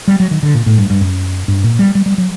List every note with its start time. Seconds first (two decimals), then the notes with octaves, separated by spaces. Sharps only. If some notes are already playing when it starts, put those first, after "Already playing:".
0.08 G3
0.20 F#3
0.31 D#3
0.43 D3
0.54 A#2
0.66 A2
0.78 G2
0.90 G2
1.01 F#2
1.48 G2
1.64 A#2
1.79 G3
1.95 G3
2.06 G3
2.18 F#3